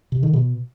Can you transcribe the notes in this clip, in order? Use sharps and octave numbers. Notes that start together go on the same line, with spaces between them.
C3
D#3
B2